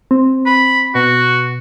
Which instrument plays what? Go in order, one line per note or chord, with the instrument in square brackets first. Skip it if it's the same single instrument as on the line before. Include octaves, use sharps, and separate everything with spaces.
[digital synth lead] C4
[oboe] B5
[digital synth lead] B2 [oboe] F#4